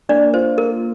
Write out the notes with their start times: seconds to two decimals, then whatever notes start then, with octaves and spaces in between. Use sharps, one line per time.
0.09 A#3 D4 D5
0.34 F4 C5
0.58 A#3 A#4